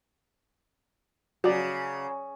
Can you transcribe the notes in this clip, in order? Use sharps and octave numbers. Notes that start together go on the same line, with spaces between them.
C#3 F#3 D5